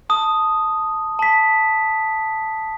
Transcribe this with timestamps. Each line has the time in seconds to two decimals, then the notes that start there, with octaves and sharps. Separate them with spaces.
0.10 A5 D#6
1.19 A5 B6